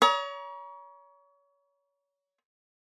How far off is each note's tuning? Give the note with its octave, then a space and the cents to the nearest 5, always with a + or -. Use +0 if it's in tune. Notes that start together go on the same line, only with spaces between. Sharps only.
C#5 +30 A#5 +35 D#6 +40